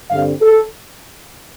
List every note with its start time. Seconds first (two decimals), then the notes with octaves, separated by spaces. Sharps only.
0.11 G2 D3 G3 C4 F5
0.42 A4